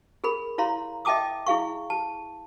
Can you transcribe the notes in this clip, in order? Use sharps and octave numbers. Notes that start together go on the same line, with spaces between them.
G#4 A#4 B5
E4 C#5 F5 A#5 C6
D#5 E5 G5 A5 D6 D#6
E4 G#4 F5 C#6
A5